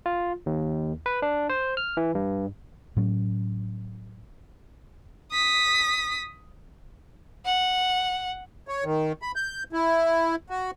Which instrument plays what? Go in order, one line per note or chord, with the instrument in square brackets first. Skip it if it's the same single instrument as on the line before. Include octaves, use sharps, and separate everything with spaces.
[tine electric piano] F4
D#2
B4
D4
C5
F6
E3
G2
[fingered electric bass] A2 F#3 C#4
[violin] D#6 B6
[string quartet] F#5
[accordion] C#5
D#3
B5
G6
E4
F#4